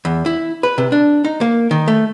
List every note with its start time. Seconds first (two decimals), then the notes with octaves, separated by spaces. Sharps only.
0.05 E2
0.26 E4
0.63 B4
0.78 C3
0.92 D4
1.25 D#4
1.41 A#3
1.71 D#3
1.88 A3